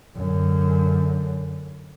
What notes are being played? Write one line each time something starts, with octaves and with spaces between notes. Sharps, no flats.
F#2 D3